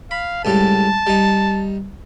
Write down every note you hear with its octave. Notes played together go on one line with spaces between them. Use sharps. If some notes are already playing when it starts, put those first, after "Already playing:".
F5 B5
C#2 A2 G3 A5
G3 D#4